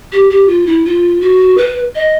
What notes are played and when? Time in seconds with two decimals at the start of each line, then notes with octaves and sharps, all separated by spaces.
0.12 G4
0.29 G4
0.47 F4
0.66 E4
0.85 F4
1.20 F#4
1.57 B4
1.95 D#5